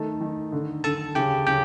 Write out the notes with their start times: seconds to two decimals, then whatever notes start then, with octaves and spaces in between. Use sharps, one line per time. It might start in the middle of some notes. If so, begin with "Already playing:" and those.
Already playing: D#3 A3 A4 A5
0.21 D#3
0.52 D3
0.84 D3 A4 A5
1.15 C#3 G4 G5
1.47 C#3 G4 G5